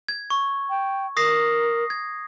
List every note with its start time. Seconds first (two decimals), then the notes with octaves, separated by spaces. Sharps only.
0.09 G#6
0.30 C#6
0.69 G5
1.17 A#4 D#6 A#6 C7
1.90 G#6